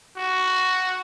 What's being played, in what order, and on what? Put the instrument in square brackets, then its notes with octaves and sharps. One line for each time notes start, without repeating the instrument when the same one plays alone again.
[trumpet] F#4